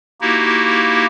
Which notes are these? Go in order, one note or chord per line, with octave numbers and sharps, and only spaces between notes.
A#3 D#4 E4 F#4 G4